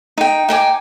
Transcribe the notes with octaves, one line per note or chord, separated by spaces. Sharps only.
D#4 G5
D#4 G5 G#5 D6